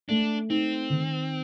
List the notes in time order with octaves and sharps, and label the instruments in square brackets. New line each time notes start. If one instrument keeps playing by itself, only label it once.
[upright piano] A3 [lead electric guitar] D4
[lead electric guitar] C4 [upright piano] D#4
[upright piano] D#3